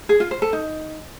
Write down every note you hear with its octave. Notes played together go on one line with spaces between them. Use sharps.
G#4
F4
C5
A4
D#4